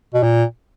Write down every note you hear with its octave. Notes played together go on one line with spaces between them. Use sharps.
B2
A#2